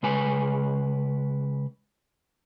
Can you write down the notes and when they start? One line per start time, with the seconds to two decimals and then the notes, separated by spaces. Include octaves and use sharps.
0.03 C#3 G#3 B4 G#5